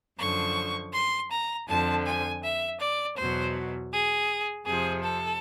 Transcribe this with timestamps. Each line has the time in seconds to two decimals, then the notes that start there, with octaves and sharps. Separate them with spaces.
0.20 F#2 D3 F3 C#6
0.94 C6
1.31 A#5
1.68 F2 D3 F3 A5
2.06 G#5
2.43 E5
2.81 D5
3.17 E2 B2 F#3 C5
3.92 G#4
4.66 F2 C3 F3 G#4
5.03 A4